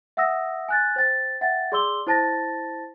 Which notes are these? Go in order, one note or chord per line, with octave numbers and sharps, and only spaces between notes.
E5 F#5 D#6 E6 A#6
G#5 F#6 A6
C5 G5 A6
E5 F#5 G5 A6
G#4 D5 C6 D6 E6 G7
E4 C5 A5 A6 A#6